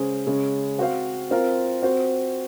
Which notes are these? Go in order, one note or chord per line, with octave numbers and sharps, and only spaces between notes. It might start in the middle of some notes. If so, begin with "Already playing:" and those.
Already playing: C#3 G#3 C#4 G#4 C5
C#3 G#3 C#4
C4 F#4 C5 F5
C4 F4 A#4
C4 F#4 C5